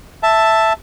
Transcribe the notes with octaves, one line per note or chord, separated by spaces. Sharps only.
E5 A5